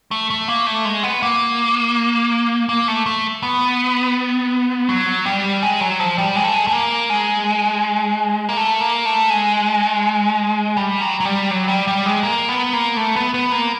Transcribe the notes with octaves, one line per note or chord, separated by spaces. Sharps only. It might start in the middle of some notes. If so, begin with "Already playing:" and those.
A3
A3
A#3
A3
G#3
B3
A#3
A#3
A3
A3
B3
F#3
G3
G#3
F#3
F3
G3
G#3
A3
G#3
A3
A#3
G#3
A#3
A3
A#3
A3
G#3
G3
F#3
F#3
G3
F#3
G3
G3
G#3
A#3
B3
A#3
A3
B3
B3
A#3